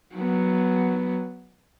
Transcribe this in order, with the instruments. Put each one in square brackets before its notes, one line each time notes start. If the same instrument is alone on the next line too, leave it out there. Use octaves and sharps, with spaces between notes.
[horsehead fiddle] F#3 B3